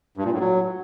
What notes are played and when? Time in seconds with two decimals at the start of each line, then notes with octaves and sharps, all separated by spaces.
0.17 G2
0.25 A#2
0.32 A2
0.40 F#3